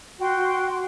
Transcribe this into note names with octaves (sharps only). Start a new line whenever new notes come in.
F#4 G5 C6